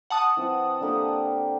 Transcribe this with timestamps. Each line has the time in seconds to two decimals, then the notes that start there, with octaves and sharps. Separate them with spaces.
0.10 F#5 A5 D#6
0.37 E3 C4
0.81 D3 A#3 G4